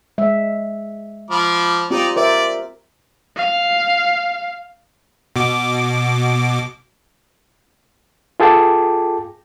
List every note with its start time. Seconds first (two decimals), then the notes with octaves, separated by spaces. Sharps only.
0.18 G#3 E5
1.31 F3 B5 D6
1.91 C4 D#4 F4 G4 D5
2.16 A#4 C5 D5 E5
3.37 F5
5.36 B2 D6
8.40 F4 G#4 A4 G5 A5 D6